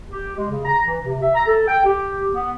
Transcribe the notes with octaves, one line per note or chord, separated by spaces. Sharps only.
G4
G#3
C#3
A#5
E3
C3
E5
A#5
A4
G5
G4
B3